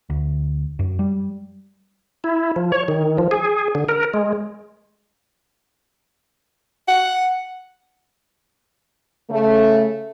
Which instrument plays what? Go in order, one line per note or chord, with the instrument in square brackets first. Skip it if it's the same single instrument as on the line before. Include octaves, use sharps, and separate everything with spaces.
[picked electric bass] D2
F#2
G3
[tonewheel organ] E4
F3
C#5
D#3
F3
G#4
D3
A#4
G#3
[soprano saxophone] F#5
[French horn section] C#3 A3